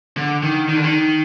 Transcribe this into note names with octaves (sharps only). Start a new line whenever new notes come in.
D3
D#3
D#3
D3
D#3